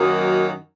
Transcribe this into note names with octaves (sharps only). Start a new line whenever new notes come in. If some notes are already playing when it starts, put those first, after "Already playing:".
Already playing: F#2 D#3 F#3 A#3 D#4